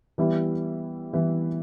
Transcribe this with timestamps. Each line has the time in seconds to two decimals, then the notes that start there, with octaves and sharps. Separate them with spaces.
0.18 E3 G3 B3 E4
1.13 E3 G3 B3 E4